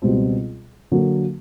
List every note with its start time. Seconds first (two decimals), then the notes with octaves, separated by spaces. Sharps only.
0.02 C#2 B2 G3 C4
0.91 D3 F#3 A#3